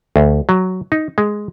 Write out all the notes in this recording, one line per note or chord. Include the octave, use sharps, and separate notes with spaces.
D2
F#3
D#4
G#3